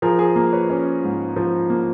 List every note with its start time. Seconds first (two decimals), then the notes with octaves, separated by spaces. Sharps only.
0.02 F3 G#4 A#4
0.19 G#4 A#4
0.36 A#3
0.53 B4 C#5
0.70 C#4
1.03 G#2
1.36 F3
1.70 A#3